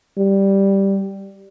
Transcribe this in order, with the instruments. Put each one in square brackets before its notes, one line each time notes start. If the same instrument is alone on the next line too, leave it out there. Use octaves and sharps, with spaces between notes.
[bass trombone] G3